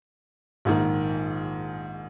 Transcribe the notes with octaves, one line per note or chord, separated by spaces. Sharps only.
A#1 G#2 D#3